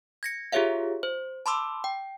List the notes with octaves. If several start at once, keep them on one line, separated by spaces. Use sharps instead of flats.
G#6 A#6 C#7
F4 G4 G#4 C#5 E5 F5
C5
A5 B5 C6 D6 E6
G5